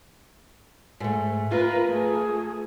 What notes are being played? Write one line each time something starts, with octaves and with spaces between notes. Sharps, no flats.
G#2 A3
F4 A#4 B4
A3 G#4